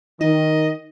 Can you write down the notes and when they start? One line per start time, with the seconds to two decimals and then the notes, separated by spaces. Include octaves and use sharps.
0.21 D#3 D#4 D#5